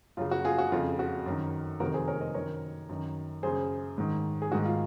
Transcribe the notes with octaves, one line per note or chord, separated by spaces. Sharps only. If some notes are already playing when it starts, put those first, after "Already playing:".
F#2 C#3 F4
F#4
F4 G#4
F#4
F2 C#3 F4
F#4
F#2 D#3
F2 C3 D#3 F#4 A#4
G#4 C5
A#4 C#5
C5 D#5
F#2 D#3 A#4 C#5
F#2 D#3
F#2 C#3 G#4 C5
G#2 D#3
G#4
G#2 D#3 F#4
F4